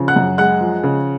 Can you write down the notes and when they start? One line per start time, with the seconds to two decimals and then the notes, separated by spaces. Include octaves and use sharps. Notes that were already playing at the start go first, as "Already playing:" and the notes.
Already playing: C#3 F3
0.08 F#5 F#6
0.16 F#2
0.38 G#3 F#5 F#6
0.61 F3
0.83 C#3